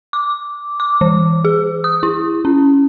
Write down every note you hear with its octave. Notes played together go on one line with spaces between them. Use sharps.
D6
D6
E3
G#4
D#6
E4
C#4